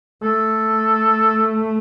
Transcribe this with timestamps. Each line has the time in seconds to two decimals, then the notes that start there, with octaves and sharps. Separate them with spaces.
0.22 A3 A4